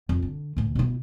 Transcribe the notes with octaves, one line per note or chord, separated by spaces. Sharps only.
F2
D3
D2 A2
B2 E4